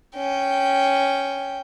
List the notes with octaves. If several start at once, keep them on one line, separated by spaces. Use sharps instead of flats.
C#4 G5